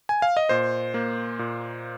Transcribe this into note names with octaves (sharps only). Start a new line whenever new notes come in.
G#5
F5
D#5
A#2 C5
A#3
A#2